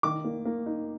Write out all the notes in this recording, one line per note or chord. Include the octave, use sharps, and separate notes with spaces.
D#3 D6
A#3
A#3
D#4